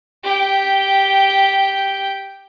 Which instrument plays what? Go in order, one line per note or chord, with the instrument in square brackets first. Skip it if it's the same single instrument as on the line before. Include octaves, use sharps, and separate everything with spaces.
[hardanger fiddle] G4 G5